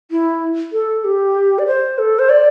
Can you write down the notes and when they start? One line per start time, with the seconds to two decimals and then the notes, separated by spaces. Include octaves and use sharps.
0.11 E4
0.72 A4
1.04 G4
1.59 D5
1.67 C5
1.98 A4
2.19 C5
2.29 D5